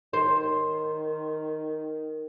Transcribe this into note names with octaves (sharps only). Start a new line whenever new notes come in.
D#3 C5